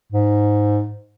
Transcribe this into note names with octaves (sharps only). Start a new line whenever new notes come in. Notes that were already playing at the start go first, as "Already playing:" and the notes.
G#2